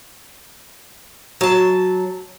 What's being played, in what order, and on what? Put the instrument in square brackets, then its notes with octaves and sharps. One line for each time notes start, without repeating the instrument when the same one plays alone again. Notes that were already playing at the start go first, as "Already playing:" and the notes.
[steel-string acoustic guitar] F#3 A5